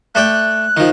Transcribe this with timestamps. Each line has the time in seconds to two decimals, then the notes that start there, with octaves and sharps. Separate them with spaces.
0.15 A3 D5 G5 F#6
0.77 D#3 F3